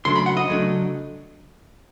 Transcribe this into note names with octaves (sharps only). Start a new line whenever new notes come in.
C#3 F#3 A3 D4 C6
B5
F#5
D#5
C#3 F#3 A3 D4